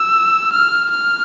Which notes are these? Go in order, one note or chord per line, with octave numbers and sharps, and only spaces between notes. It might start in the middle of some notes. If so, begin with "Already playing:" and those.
Already playing: E6
F6
F6